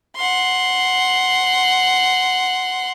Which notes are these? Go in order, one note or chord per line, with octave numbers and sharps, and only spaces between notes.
F#5 C6